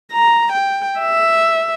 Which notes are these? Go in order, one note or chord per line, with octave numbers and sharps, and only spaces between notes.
A#5
G5
E5